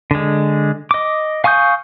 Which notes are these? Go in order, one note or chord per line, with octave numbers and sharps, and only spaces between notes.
D3 G#3
D#5 D6
F5 G#5 C#6 D#6 G6